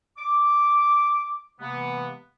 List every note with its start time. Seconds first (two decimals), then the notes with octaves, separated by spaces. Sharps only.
0.17 D6
1.60 C3 E3 G#3 A#3 B3